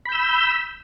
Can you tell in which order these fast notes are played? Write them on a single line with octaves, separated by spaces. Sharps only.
B5 G6 E6